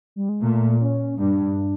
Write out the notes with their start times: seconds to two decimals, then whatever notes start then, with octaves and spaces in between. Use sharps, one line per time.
0.16 G3
0.29 G#3
0.42 A#2 A3
0.81 C#4
1.19 G2 D4